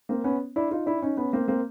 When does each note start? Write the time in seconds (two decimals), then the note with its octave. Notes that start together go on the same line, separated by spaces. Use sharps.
0.09 A#3 C4
0.24 B3 C#4
0.56 D4 E4
0.71 D#4 F4
0.86 D4 E4
1.02 C#4 D#4
1.17 B3 C#4
1.33 A#3 C4
1.48 A#3 C4